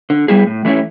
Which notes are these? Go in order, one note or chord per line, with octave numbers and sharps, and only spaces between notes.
D3
G3 B3 E4 G#4
A2
E3 A3 C#4 E4